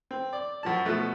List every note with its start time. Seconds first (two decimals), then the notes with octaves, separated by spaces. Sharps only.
0.11 C4
0.33 D5
0.63 F#2 F3 A5
0.85 B2 F3 A3